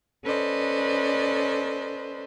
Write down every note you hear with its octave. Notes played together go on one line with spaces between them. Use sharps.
C#4 A4 B4 C5 D5 D#5